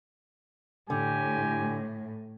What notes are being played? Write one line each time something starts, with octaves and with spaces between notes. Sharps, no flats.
A2 D3 G4 G#5